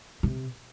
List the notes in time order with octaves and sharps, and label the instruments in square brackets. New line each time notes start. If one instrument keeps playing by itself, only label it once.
[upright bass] C3